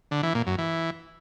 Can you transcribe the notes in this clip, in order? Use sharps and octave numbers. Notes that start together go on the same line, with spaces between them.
D3
E3
A#2
F#2
E3